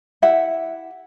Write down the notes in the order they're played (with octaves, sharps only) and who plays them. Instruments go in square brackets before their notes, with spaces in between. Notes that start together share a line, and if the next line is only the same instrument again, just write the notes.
[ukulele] E4 G4 E5 F#5